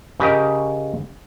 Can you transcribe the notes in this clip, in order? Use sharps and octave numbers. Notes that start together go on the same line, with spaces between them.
C#3 G4 A#4 D#5